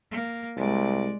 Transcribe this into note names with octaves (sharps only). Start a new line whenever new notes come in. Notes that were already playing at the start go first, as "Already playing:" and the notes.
A#3
C2 G#3 D5